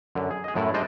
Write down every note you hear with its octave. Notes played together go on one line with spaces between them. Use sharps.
F#2 D3
G#4
G#4 D#5
F#2 A2 A3 E4
G3 G#3 D4 C5 D5 D#5